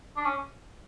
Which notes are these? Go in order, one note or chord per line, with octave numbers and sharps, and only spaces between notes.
D4
C#4